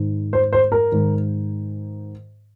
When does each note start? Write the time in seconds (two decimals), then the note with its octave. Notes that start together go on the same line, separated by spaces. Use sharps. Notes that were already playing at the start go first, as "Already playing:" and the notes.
Already playing: G#2 D#3
0.33 C5
0.53 C5
0.72 A#4
0.92 G#2 D#3